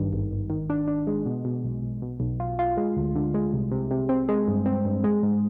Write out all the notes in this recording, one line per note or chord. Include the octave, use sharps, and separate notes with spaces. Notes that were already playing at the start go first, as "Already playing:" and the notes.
Already playing: G#1 G2 D#3
G#1
G#1
D#3
D4
D4
G#3
B2
B2
B1
B1
B2
B1
F4
F4
G#3
D2
D3
G#3
C2
C3
C3
C4
G#3
G2
C4
G2
G#3
G#2